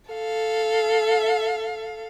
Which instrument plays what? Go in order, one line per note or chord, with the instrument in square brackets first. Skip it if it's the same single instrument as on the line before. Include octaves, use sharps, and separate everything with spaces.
[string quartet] A4 F5